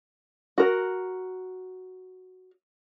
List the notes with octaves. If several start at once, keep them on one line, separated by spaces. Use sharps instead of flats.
F#4 A#4